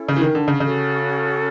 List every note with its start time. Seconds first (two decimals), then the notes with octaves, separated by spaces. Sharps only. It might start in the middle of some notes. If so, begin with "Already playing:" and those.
Already playing: C#4 E4 A4
0.09 C#3
0.16 E3
0.21 D#3
0.35 D3
0.48 C#3
0.60 C#3 C#4 F#4 A4